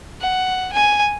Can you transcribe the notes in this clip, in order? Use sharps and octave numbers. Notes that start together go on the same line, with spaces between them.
F#5
G#5